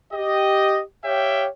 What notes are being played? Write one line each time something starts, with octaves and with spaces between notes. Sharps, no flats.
G4 D#5
G4 C#5 E5 F5 G5